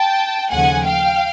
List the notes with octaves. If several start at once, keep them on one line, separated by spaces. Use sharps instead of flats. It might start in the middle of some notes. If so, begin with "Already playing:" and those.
Already playing: G5 A5
D#2 C#3 F3 A3 F#5 G#5
F5 G5